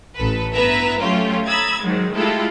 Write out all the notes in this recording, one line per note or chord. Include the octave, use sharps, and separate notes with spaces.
A1 A4 B4
G2 B3 E4 B4 E5 A#5
F#3 A3 C#4 F4 G4
A#5 B5 D#6 E6 G#6 A6
G#2 D#3 F#3 G#3
G#3 A3 E4 F4 G4 A4